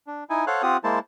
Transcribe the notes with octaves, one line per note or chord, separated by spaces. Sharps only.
D4
D#4 E4 G#5
A4 C5 C#5 F5 F#5 F#6
C4 F4 G4 F#5 D#6
G#3 A#3 E4 C5 A5